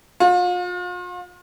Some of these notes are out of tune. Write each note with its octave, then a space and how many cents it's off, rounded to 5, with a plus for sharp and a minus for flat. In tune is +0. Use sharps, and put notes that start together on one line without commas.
F4 +40